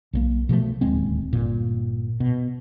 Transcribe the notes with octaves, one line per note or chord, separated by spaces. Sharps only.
B1 F#3 A#3
B2 F3 F#3 A3
D1 D#2 G#3 C4
G1 A#2
B2